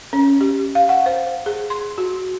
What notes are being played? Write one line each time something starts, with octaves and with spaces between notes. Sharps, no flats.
C#4
G4
F5
F#5
C5
G#4
C6
F#4